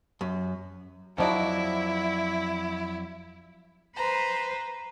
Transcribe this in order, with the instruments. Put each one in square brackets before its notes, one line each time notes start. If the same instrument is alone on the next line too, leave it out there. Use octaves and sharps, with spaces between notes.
[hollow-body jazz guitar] F#2
[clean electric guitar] F2 F#3 D5 [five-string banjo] F3 D#4 F#4 [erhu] E4
[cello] B4 C5 [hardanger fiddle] A#5